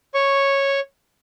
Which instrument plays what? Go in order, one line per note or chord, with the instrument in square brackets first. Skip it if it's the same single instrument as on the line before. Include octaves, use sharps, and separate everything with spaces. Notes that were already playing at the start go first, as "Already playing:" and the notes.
[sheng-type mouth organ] C#5 C#6